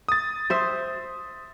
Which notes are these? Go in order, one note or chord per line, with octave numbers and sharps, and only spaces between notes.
D#6 A6
C5 E5